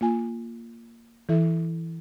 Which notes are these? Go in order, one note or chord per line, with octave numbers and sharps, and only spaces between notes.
A#3 F4 G#5
E3 E4 A4 E5